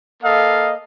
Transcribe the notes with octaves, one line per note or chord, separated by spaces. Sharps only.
A#3 A4 D#5 F5